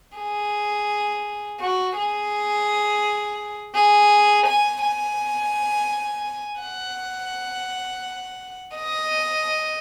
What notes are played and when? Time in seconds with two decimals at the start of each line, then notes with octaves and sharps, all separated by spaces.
0.17 G#4
1.60 F#4
1.96 G#4
3.75 G#4
4.46 G#5
4.82 G#5
6.61 F#5
8.76 D#5